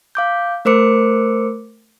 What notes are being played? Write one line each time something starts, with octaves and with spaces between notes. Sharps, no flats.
F5 D6 G6
A3 A#4 C5 D6 C#7